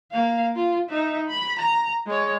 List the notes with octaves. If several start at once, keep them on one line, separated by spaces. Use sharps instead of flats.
A#3 F5
F4
D#4 E5
B5
A#5
G#3 C#5